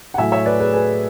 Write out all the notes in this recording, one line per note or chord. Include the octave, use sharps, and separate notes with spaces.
F#5
A2 F#3 A3 E5 G#5
C#5 E5
B4 D5
G#4 B4
G#4 B4